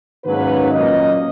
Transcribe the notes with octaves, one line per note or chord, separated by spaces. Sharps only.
G#2 D#3 F#3 A#3 C#4 B4
A#2 F#3 A#3 C#4 D#5